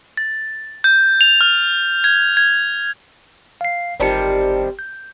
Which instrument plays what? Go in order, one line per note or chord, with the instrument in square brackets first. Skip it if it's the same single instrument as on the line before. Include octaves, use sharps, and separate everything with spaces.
[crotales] A6
G6
F7
F6
G#6
G#6
[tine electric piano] F5 C7
[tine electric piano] G1 A5 C#7 [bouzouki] D#3 G3 C4
[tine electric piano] G6